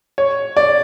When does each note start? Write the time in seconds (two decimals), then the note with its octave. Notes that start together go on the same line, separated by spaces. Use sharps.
0.18 C#5
0.57 D5